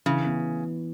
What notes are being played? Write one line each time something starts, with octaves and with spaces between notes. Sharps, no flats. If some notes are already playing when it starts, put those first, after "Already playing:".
C#3 E3
B3